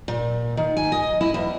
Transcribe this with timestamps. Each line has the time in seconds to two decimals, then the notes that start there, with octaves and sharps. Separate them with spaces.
0.08 A#2
0.57 D#3
0.77 G#5
0.92 D#5
1.21 E4
1.34 E2